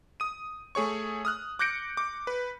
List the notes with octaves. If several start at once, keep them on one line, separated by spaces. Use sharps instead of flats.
D#6 D#7
A3 G#4 C#5 C#6
D#6 F6 F#6
D6 F#6 G6 A#6 C#7 D7
D6
B4